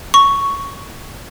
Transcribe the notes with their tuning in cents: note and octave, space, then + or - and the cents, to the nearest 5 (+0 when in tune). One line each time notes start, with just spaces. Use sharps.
C#6 +5